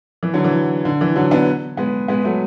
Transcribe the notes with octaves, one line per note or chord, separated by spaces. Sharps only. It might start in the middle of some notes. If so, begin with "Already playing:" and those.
E3
D3 F#3
E3
D3
E3
D3 F#3
B3 D4
G#3 B3
G#3 B3
F#3 A3